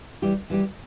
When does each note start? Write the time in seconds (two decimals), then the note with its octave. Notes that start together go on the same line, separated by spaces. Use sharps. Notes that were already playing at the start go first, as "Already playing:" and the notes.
0.22 E3 G3 E4 G4
0.50 E3 G3 E4 G4